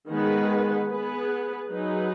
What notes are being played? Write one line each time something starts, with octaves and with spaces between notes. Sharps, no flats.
D#3 G#3 B3 G#4 B4
B3 G#4 B4
F#3 D#4 G#4 B4